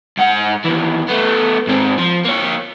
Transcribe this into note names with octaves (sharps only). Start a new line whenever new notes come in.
G#2 F#5
D#2 E3
A3 B3
G#2 C4
F3
A#3 C#5